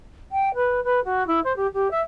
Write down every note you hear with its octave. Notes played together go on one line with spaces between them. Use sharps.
G5
B4
B4
F#4
E4
C5
G4
G4
E5